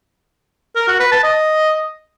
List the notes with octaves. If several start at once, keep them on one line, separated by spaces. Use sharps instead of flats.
A#4
F#4
B4
A5
D#5